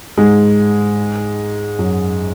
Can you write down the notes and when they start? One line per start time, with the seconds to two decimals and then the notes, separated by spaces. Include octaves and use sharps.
0.17 G#2 G#3
1.79 F#2 F#3